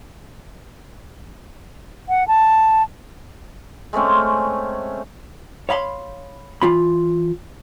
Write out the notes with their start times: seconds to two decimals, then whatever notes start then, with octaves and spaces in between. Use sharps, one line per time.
2.09 F#5
2.28 A5
3.93 G#3 A3 C4 C#4
5.69 C#5 F5 B5 C6
6.62 E3 F4 B5